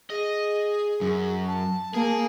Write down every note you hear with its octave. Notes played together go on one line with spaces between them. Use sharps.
G#4 D#5
F#2
A5
A#3 G#4